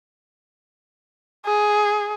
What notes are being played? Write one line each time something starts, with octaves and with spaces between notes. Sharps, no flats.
G#4